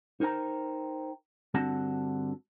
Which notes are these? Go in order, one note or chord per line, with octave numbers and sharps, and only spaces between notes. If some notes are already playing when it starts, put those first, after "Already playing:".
D#4 A#4 C5 G5 A#5
G2 D3 C4 F#4 F#5 A5